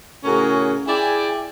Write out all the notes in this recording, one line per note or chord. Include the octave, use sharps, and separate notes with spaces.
A2 C#3 C#4 F#4 G#4 A#4
E4 G#4 D5 G5 G#5